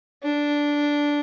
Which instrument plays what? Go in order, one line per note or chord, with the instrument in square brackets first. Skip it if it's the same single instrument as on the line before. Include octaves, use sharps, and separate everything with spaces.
[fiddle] D4